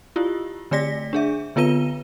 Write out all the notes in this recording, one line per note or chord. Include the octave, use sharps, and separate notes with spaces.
E4 F4 G4
D3 A3 D5 A#6 B6
D4 G#4 E5
D3 B3 F4 B4 D#7 G7